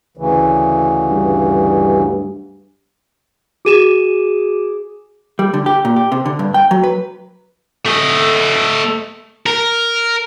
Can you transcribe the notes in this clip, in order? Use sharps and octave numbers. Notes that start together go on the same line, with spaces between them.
D2 C#3 E3
G2
F#4 G#4 D6 D#7 E7
G3
D3
G4
A#2
G4
C3
D3
G2
G5
F#3
B4
A3 D#5
A#4